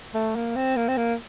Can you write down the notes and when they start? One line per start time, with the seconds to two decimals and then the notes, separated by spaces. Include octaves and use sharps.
0.14 A3
0.36 A#3
0.56 C4
0.76 A#3
0.88 C4
0.97 A#3